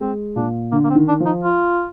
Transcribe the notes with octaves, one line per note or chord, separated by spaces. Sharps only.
G#3 C4
A#2 D4
D3 A#3
A#3
C4
D#3
D4
F3
D#4
F4